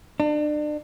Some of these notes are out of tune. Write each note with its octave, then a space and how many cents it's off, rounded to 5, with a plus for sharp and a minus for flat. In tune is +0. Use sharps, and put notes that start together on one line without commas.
D4 +35